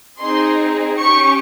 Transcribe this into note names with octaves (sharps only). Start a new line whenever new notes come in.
C4 D#4 G#4 C6
C#4 G4 C#6